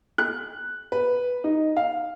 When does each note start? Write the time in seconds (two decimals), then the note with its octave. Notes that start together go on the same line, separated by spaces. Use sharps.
0.18 F#6
0.92 B4
1.44 D#4
1.77 F5